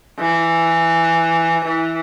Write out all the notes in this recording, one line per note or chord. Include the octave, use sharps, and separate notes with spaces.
E3
E3